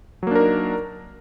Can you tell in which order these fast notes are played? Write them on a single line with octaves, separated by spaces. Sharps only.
F#3 A#3 D4 A#4 D#4